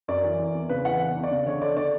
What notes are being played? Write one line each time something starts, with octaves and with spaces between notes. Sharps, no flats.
F#2 D5
E3
E3
E2
C#3 B4
E3 F#5
E2
E2
D5
C#3
D3 C#5
D3 D5
D5